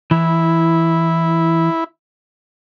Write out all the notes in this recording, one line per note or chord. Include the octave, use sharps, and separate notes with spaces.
E3 E4